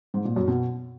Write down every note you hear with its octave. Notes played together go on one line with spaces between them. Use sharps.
G#2
A#2
F#2
B2